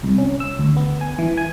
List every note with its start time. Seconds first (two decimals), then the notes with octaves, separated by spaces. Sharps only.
0.03 C2
0.18 C#4
0.40 E6
0.59 D2
0.77 B3
1.01 G#5
1.19 E3
1.37 G#5